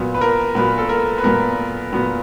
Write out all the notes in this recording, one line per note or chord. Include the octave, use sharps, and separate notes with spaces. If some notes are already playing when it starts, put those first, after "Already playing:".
Already playing: A#2 F#3 B3
B4
A#4
A#2 F#3 B3 B4
A4
A#4
B4
A#2 F#3 B3 A#4
A#2 F#3 B3